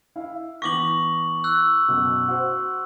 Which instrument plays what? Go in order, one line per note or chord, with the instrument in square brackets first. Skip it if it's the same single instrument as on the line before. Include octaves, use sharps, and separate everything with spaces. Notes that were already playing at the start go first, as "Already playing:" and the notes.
[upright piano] E4 F5
[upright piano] E3 B3 A#6 [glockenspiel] C#6 D6 F#7
[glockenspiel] E6 F#6
[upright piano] F#2 B2
F#4 C5